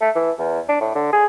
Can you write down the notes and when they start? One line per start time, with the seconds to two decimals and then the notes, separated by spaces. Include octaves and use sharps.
0.01 A3
0.16 E3
0.39 E2
0.69 D4
0.81 A2
0.95 D3
1.13 G#4